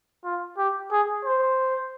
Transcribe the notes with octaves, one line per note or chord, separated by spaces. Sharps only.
F4
G4
G#4
C5